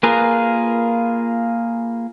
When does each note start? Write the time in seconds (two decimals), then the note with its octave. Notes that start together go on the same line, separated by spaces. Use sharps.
0.03 A#3 F4 G#4 A#4 B4